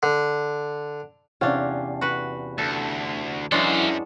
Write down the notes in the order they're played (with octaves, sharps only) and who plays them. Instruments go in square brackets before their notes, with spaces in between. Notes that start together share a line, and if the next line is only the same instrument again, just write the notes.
[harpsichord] D3
[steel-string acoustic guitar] E2 C3 F5 [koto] C#4 D4
[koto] F#4 B4
[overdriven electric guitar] D2 [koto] A4
[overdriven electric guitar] F#2 [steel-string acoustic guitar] E3 [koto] F#3 G#3 D4 [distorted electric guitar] A4 F5